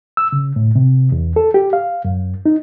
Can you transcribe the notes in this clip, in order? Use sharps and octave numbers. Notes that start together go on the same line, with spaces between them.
E6
C#3
A2
C3
E2
A4
G4
F5
F#2
D#4